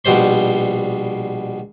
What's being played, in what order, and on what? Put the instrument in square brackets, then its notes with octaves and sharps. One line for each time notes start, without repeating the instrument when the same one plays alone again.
[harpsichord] A#1 B2 G3 C5 C6